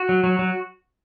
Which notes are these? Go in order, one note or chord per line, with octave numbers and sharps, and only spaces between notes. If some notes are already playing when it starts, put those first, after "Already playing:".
Already playing: F#4
F#3
F#3
F#3